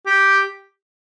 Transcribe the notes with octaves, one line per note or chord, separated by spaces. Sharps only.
G4